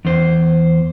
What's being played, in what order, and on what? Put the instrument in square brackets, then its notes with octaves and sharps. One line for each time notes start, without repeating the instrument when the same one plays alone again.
[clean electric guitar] E2 C5